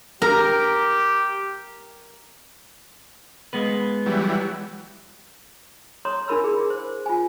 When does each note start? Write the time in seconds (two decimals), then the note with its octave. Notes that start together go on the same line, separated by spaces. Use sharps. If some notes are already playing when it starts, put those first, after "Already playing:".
0.22 G4 A#4
3.53 G#3 B3 B4
4.06 E3 F#3 G3
6.05 C#5 A#5 C6 D#6
6.28 D4 E4 A#4 B5 E6
6.44 G#4
6.70 C5
7.06 F4 G#5